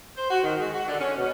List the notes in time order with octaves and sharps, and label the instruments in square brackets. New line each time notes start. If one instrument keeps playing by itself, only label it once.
[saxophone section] C5
F#4
D#3
G#3
F#4
D3
C#4
B2